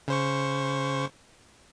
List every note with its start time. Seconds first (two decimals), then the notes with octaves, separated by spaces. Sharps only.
0.08 C#3 C5 C#6